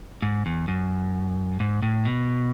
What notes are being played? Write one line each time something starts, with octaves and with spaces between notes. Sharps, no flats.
G#2
E2
F#2
G#2
A2
B2